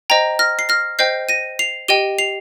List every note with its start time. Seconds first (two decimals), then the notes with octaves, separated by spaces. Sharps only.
0.10 C5 D#5 G5 A#5
0.39 F6 A#6
0.59 C7
0.69 F6 A#6
0.99 C5 D#5 G5 G6 C7
1.29 A#6 D#7
1.59 C7 F7
1.88 G4 D#5 G5 D#7 G7
2.18 C7 F7